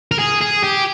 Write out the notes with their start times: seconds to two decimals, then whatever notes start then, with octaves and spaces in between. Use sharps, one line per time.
0.12 A#4
0.19 G#4
0.41 G#4
0.64 G4